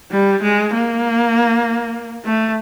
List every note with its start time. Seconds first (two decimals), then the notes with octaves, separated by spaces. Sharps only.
0.12 G3
0.42 G#3
0.73 A#3
2.25 A3